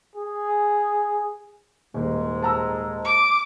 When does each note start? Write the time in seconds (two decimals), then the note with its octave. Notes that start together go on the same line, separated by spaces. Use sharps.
0.15 G#4
1.94 D#1 G#2 G#3
2.43 A5 A#5 E6
3.05 D6